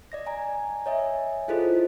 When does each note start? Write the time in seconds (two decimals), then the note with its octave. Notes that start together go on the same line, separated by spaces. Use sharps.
0.12 D5 D#5 A#6
0.26 G#5 A#5
0.86 C#5 D#5 E5 G#5
1.48 E4 F4 G#4 A4 C5 D#5